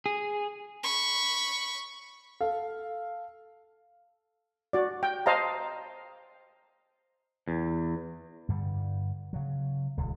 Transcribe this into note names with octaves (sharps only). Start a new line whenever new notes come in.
G#4
B5 C#6
A4 F5
F#4 D5
G5
C5 D#5 F5 A5 A#5
E2
G2 D3 G3
C#3 F#3
D#1 C#2